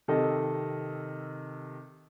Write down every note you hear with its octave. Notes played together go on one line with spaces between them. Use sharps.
C3 D#3 A4 D#5